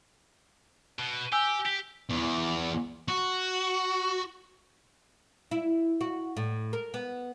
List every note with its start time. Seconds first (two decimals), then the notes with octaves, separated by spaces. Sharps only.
0.99 B2
1.32 G4 G#5 E6 G6
1.66 G4 B6
2.10 E2
3.08 F#4
5.51 E4
6.01 F#4
6.37 A2
6.73 A#4
6.94 B3